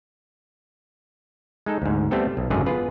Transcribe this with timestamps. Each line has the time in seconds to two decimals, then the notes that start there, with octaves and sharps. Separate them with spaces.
1.66 G#3 D#4 A4
1.82 D2 G#2
2.11 G3 A3 B3 C4 G4 A4
2.37 B1
2.50 G#1 C#2 F#2 D3 F#3 G#4
2.66 B3 F4 G#4 B4